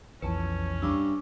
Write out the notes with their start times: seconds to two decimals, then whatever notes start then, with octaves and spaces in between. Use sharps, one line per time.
0.22 B1 F2 E3 C#4 B4 A5
0.82 G2 C#6 D6 E6